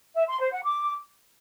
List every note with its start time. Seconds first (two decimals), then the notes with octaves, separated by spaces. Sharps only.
0.16 E5
0.28 C6
0.40 C5
0.52 F#5
0.64 D6